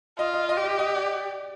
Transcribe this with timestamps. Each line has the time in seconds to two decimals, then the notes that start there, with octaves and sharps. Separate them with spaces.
0.19 F4 D#5
0.34 D#5
0.49 D#5
0.57 G4
0.64 D#5
0.79 D#5
0.95 D5